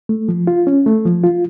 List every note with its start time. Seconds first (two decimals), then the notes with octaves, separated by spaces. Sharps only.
0.09 A3
0.29 F3
0.47 F4
0.67 C#4
0.86 A3
1.06 F3
1.24 F4